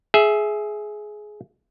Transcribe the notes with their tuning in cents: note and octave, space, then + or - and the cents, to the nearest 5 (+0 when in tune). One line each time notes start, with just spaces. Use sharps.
G#4 +15 E5 +0